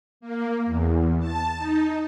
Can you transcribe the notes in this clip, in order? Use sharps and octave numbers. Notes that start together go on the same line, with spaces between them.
A#3
E2
A5
D#4